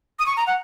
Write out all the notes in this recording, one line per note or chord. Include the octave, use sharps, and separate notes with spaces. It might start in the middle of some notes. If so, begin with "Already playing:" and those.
D#6
C#6
A#5
F#5